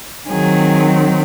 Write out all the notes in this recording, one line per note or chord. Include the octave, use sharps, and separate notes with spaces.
D#3 F#3 C4 G#4